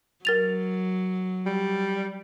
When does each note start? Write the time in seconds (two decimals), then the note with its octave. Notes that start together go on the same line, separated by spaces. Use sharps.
0.25 F#3 A#4 A6 F7
1.46 G3